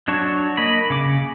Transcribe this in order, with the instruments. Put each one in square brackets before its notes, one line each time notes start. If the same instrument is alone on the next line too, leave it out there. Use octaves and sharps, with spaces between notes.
[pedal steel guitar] F#3 D4 C#5 A5 C#6
A#3 D#5 B5
C#3 D6